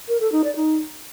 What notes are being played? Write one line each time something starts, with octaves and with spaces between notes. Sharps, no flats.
A#4
A4
D#4
D5
D#4